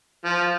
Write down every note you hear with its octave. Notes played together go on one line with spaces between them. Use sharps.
F3